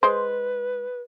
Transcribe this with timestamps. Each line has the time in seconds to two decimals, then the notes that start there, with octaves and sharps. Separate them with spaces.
0.03 G#3 B4 C5